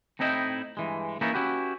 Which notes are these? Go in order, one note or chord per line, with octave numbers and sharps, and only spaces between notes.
A2 C4 D#4 E4 D#5 G5
G2 E3 G#3
E3 A#3 B3 C#4 D#4 E4
C#4 E4 F#4 G4 B4